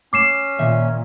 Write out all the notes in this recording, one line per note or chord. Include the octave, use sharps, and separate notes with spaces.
C#4 D6 C7 E7
A#2 D#3 E5